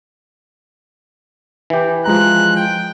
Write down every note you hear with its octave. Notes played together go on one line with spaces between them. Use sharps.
E3 G4
F3 G#3 A#5 F#6
G5